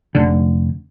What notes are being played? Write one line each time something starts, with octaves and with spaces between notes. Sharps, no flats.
F1 D3